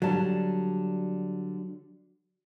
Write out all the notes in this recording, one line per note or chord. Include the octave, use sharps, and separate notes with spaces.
D3 F#3 G3 A5